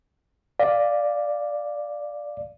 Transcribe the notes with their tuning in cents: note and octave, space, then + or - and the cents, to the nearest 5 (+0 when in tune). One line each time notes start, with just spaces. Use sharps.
D5 +0 F5 +0